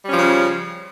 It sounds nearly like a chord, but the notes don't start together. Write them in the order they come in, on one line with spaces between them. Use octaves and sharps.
G3 C#4 F3 C#3